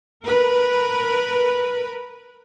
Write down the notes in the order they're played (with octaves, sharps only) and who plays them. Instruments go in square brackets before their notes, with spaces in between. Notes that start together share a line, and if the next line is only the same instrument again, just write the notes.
[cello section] A#4 B4